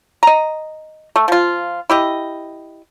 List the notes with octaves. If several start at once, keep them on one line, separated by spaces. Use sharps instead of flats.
D#5 A#5
A3
F3 F4
E4 G4 D#5